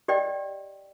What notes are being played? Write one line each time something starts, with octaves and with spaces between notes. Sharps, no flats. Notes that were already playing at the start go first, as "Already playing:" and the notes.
G4 D5 D#5 G5